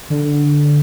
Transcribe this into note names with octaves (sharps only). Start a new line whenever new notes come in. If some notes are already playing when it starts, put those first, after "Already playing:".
D3